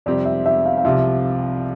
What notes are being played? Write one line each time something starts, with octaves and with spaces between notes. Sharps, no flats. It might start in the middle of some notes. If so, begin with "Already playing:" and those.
F2 C3 G3 C4 G4 D5
E5
E5
F5
F5
C2 C3 F3 E5